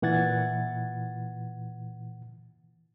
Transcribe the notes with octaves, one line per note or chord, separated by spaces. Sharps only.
A#2 E3 F#5 G#6 A6